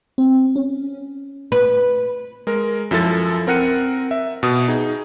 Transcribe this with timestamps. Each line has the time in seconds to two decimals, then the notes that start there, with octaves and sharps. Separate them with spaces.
0.18 C4
0.56 C#4
1.52 B4
2.47 G#3 A#4
2.91 F#2 F3 E4 A4 A6
3.47 C4 A#4 F#5 F#6 C#7 D#7
4.11 E5
4.43 B2 D#6
4.68 D#4 G#4